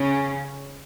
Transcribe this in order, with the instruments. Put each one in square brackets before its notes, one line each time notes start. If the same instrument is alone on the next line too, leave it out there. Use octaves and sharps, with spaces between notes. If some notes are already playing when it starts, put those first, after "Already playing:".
Already playing: [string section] C#3 C#4